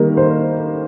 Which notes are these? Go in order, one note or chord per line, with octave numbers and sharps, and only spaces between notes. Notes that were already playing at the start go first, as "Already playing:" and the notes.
Already playing: D#3 G3 A#3 A#4
C5